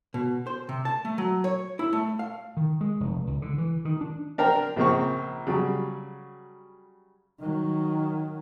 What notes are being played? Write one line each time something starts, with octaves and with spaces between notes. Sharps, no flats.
B2
C5
C3
A5
A3
F#3
C#5
E4
A3
F5
D#3
G#3
F1
C#2
D3
E3
D#3
D4
D4 A#4 C5 G5
A#1 C#3 A#3 C4 C#6
C#3 F#3 G3
D#3 F#3